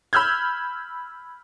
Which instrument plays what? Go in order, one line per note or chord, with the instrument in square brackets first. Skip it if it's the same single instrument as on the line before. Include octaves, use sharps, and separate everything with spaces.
[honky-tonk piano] B5 E6 F6 G6 G#6